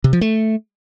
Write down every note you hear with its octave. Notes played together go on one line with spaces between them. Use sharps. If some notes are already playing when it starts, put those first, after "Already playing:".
C3
F3
A3